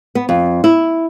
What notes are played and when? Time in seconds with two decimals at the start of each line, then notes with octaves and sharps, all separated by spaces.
0.15 B3
0.29 F2
0.64 E4